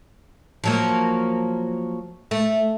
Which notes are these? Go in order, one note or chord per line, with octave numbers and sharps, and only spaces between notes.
F3 F#3 A#3
A3